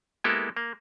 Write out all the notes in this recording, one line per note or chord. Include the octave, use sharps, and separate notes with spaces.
G#3 A#3 B3 E4 G4 A4
A#3